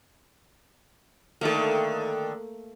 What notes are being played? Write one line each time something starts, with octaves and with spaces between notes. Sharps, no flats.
D3 D#3 A3 A#3